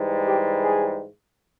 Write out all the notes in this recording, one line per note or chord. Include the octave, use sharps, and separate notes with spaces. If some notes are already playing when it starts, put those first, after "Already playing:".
Already playing: G#2 E3 G3
G4
G#4